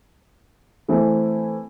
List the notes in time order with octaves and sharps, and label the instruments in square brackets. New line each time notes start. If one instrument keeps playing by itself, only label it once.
[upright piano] E3 A3 C4 E4